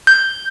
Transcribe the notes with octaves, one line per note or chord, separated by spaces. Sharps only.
G6